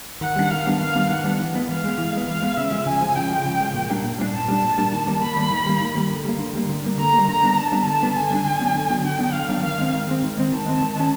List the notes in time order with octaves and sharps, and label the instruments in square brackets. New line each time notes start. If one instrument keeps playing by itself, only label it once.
[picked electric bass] D#3 [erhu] F#5
[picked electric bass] G3 B3 D4
[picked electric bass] D#3 [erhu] F5
[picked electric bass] G3 B3 D4
[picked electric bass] D#3 [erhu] F5
[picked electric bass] G3 B3 D4
[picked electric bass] D#3 [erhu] F#5
[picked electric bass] G3 B3 D4
E3
G#3 B3
[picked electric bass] E3 [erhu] F5
[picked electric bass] G#3 B3
E3
G#3 B3
[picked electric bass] E3 [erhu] F5
[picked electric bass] G#3 B3
[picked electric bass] C#3 [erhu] E5
[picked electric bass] F3 G#3
[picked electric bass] C#3 [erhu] G#5
[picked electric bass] F3 G#3
[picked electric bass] C#3 [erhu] G5
[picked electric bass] F3 G#3
C#3
F3 G#3
A#2
G3 A#3 D4
A#2
G3 A#3 D4
[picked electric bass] A#2 [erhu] A5
[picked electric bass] G3 A#3 D4
A#2
G3 A#3 D4
D#3
G3 A#3
[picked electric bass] D#3 [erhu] B5
[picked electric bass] G3 A#3
D#3
G3 A#3
D#3
G3 A#3
D3
G3 A#3
D3
G3 A#3
D3
G3 A#3
[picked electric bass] D3 [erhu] A#5
[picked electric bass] G3 A#3
[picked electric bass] D3 [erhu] A#5
[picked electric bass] G3 B3 D4
[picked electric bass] D3 [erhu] A5
[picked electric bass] G3 B3 D4
[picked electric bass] D3 [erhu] A5
[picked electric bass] G3 B3 D4
[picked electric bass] D3 [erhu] G#5
[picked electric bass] G3 B3 D4
D3
F#3 B3 D4
D3
F#3 B3 D4
[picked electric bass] D3 [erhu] G5
[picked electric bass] F#3 B3 D4
[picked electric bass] D3 [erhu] F5
[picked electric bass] F#3 B3 D4
[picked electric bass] D#3 [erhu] F5
[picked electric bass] G#3 C4
D#3
G#3 C4
D#3
G#3 C4
[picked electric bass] D#3 [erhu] A5
[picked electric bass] G#3 C4
D#3
G#3 C#4